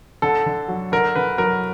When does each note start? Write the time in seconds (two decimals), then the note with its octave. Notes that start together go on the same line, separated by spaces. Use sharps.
0.22 D3 A4
0.46 D3
0.68 F#3
0.92 D3 A#4
1.15 D3 B4
1.38 F#3 A#4